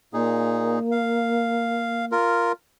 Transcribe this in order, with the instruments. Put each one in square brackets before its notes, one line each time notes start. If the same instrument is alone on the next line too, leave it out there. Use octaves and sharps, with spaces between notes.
[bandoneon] A#2 D#4 G#4 [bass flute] A#3
[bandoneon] F5
F4 A#4